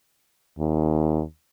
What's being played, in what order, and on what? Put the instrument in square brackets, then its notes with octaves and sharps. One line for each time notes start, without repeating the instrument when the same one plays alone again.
[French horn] D#2